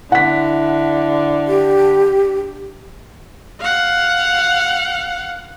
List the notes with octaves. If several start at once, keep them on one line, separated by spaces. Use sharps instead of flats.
D3 E4 F#5 B6
G4
F5 F#5